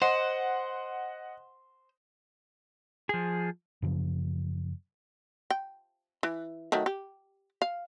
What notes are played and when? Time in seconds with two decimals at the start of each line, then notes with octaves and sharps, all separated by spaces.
0.02 C5 D#5 F#5
3.09 F3 G#4
3.82 F#2 C#3 F3
5.50 G5
6.23 E3
6.72 D#3 F#3 A3
6.86 G4
7.62 F5